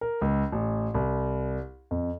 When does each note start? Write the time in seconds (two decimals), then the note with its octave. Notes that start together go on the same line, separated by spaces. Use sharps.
0.01 A#4
0.21 C#2
0.52 A1
0.94 C2
1.91 F2